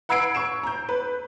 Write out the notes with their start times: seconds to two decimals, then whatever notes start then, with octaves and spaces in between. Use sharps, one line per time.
0.09 F#5 B5 E6 G#6 C7 D7
0.35 C#6 E6 D7 E7
0.63 A#5 G6
0.89 B4